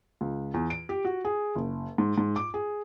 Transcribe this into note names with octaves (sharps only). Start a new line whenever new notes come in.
C#2
E2
D7
G4
F#4
G#4
F#1
G#2
G#2
D6
G#4